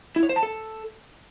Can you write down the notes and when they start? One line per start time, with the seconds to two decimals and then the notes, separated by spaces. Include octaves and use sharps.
0.16 E4
0.23 C#5
0.29 C5
0.36 A5
0.43 A4